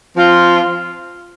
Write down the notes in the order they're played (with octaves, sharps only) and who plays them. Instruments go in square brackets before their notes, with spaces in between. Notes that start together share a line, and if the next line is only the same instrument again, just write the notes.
[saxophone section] F3 C4 F4